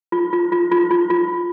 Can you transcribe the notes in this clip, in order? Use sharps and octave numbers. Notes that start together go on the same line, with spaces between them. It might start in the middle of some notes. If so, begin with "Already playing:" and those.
F4
F4
F4
F4
F4
F4